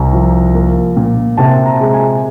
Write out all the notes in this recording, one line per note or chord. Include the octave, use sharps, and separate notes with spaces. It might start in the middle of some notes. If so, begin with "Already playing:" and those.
Already playing: C2 A#5
F3
A#3
A#2
C3 A5
A#5
G#3
G#5